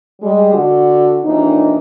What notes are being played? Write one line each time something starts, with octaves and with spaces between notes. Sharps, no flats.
G3 G#3
D3 F#4
D#2 A#2 E3 D4 D#4